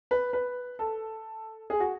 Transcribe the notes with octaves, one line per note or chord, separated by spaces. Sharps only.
B4
B4
A4
G#4
F#4